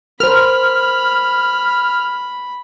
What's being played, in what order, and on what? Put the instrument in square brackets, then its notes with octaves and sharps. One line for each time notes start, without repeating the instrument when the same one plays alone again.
[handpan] A#4 C5 [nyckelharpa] B5 [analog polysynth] F6